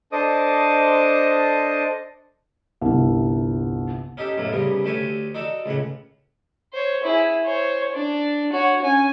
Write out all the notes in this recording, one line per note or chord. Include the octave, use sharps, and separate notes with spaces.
D4 A4 C5 D#5 D6 D#6
G1 C2
C#4 D#4 G4 A4
B1 F#2 A2 A#3
C2 C#3 G3 B3
D2 A3 G4 C#5 G#5
D#4 F#4 A4 D5 A5
C#2 A2 C#3 F#5
C5 C#5
E4 G#4
C5 C#5
D4
F#4 C#5
C#4 G#5